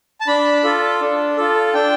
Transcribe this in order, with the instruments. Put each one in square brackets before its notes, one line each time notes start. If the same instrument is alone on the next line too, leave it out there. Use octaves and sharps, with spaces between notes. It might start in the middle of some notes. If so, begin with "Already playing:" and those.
[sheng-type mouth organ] A5
D4 B5
F4 A4
D4
F4 A4
D4 G5